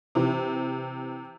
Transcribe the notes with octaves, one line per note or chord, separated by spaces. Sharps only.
C3 E3